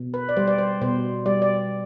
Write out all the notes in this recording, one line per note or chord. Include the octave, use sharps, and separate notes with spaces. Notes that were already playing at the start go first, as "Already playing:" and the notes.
Already playing: B2
B4
D5
G3 C5
D5
C5
B2 C5
G3 D5
D5